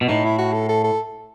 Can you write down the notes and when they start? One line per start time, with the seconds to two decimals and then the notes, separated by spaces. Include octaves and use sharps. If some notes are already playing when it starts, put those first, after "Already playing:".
0.01 B2
0.08 A2 D#4
0.24 E4
0.38 F#4
0.53 A4
0.69 A4
0.84 A4